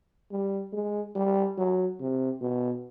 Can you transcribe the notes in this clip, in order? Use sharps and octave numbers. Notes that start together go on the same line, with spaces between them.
G3
G#3
G3
F#3
C3
B2